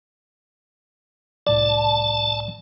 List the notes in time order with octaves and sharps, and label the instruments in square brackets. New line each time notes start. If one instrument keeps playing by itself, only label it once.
[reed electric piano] C2 A2 D5 [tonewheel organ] A5